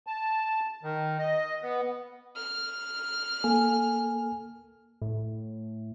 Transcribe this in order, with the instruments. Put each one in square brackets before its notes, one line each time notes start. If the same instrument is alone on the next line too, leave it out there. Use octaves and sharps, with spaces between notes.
[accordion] A5
D#3
D#5
B3
[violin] F6
[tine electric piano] A#3 A4 G#5
[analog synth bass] A2